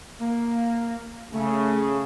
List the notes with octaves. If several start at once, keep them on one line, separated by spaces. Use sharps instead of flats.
A#3
C#3 A3